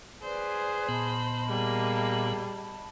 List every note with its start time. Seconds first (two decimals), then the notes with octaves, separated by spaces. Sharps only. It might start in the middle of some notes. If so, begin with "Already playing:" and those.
0.22 G#4 B4 C5 D5
0.89 A#2 B3 D#5 A5 B5
1.49 G3 A#3 G#4